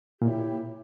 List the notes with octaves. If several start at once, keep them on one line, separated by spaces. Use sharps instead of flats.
A#2 E4 G4 C#5 E5